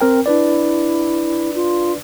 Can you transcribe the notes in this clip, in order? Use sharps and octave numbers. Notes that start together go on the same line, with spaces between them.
C4 A#4 G5
D4 E4 B4 D5
F4